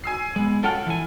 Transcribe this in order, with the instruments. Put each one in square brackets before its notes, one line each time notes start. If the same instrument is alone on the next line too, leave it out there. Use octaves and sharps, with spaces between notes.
[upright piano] G#5 E6 C7
[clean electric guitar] G#3 B3
[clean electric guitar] C#4 F4 G5 [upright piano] A4 F#5 F6
[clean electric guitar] E3 G#5